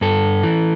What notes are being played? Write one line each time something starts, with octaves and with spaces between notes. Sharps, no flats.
G2 A4
E3